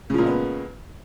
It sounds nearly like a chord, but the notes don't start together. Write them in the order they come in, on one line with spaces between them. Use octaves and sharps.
C#3 F3 A#2 G#3 B3